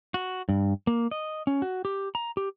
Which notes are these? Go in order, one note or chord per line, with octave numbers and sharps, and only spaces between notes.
F#4
G2
A#3
D#5
C#4
F#4
G4
A#5
G4